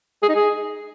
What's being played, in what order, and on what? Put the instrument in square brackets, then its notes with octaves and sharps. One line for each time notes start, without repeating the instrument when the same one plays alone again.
[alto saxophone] G#4
D#4
G#4